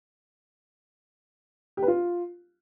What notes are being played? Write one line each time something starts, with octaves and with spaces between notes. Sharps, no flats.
G4
B4
F4